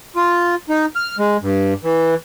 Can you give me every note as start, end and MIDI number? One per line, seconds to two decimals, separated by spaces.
0.16 0.55 65
0.69 0.86 63
0.96 1.16 89
1.19 1.37 56
1.42 1.74 43
1.84 2.15 52